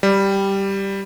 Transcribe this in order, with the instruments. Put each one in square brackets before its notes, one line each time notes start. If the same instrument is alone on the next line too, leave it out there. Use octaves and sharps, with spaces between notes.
[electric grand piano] G3